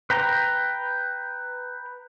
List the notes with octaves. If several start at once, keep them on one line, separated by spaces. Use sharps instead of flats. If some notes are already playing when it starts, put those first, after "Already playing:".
B4 G5 A#5